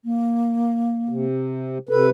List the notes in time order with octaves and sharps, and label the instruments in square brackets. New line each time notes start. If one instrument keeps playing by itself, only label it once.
[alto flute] A#3
[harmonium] C3
[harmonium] C3 B4 [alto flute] A4